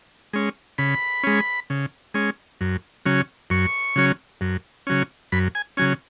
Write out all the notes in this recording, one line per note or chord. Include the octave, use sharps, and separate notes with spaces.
G#3 C#4
C#3 B5
G#3 C#4
C#3
G#3 C#4
F#2
C#3 F#3 C#4
F#2 C#6
C#3 F#3 C#4
F#2
C#3 F#3 C#4
F#2 B5
G#5
C#3 F#3 C#4 G#5